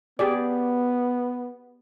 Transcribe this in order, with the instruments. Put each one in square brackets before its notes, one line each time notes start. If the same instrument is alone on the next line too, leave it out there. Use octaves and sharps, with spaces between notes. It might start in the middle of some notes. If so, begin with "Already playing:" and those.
[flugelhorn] B3 [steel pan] G4 G#4 D5